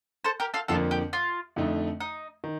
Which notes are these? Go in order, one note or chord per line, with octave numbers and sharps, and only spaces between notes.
A4 C5
G4 A#4
F4 A4
F2 D3 F3 A#3 F4 A4
G4
F4
F2 D3 A3 D#4
D#4
D#3